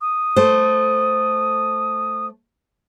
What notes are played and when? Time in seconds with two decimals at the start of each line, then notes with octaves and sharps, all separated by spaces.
0.01 D#6
0.36 A3 C5